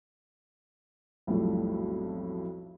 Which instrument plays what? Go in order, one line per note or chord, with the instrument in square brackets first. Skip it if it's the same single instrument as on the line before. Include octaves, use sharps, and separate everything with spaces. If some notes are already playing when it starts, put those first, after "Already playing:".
[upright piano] B1 F2 A2 F#3 G3 A3